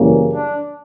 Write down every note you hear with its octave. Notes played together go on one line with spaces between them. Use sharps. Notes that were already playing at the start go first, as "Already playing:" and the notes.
Already playing: F#2 C#3 E3 G3 A#3
D4